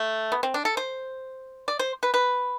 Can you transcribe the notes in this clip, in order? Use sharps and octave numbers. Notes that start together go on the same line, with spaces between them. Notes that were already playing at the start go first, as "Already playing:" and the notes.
Already playing: A3
B3
C4
D4
A4
C5
D5
C5
B4
B4